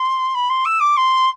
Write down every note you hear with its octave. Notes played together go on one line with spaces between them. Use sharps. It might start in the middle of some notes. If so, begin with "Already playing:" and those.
Already playing: C6
B5
C6
E6
D6
C6